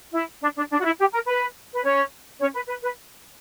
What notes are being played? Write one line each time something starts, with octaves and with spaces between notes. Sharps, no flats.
E4
D4
D4
D4
F#4
E4
G4
A#4
B4
B4
C#4 C#5
C#4 C#5
B4
B4
B4